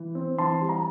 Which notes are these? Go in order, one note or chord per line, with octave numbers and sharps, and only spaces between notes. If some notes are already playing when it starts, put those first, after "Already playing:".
Already playing: E3
C4
E3 A5 C6
G3
A#5